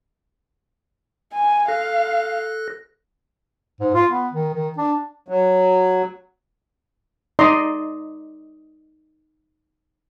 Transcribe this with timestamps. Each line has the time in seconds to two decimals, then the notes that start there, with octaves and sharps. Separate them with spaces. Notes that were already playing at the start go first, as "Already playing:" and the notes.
1.33 G#5
1.68 A4 F5 F#6 A#6
3.80 G#2
3.94 F4
4.11 B3
4.33 D#3
4.54 D#3
4.78 D4
5.28 F#3
7.39 D#4 D5 D#5 A#5 C6